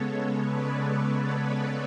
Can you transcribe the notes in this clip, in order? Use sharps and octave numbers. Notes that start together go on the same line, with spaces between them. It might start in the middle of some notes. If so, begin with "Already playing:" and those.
Already playing: C#3 G#3 B3 A4 C#5
B4 D5